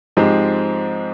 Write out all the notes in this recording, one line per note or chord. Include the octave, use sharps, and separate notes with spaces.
G#2 F3 G#3 C4 G4